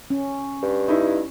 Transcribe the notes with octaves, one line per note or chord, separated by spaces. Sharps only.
C#4
G2
D#4 E4